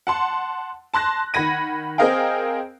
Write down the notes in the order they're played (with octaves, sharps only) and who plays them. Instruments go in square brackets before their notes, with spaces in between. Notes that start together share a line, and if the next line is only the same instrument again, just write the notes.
[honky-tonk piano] F#5 A5 C6
A5 C6 F#6 A#6
D#3 F#5 B5 G#6 A#6 D#7
C4 G#4 A#4 D#5 F5 G5